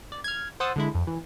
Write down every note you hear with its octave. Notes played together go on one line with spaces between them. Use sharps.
D5
F6 G#6
C5 F#5 D#6 E6 A6
D3 G#3 E4
F2
E3